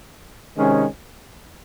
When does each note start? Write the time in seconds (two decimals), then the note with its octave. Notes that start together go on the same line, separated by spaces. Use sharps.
0.58 C3 D#3 G#3 C#4